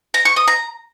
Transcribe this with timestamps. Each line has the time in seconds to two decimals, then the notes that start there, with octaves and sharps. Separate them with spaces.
0.14 A#5
0.25 C#6
0.36 D#6
0.48 A#5